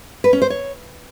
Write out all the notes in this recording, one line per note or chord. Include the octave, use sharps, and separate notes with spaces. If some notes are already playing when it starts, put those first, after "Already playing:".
B4
C#4
C5
C#5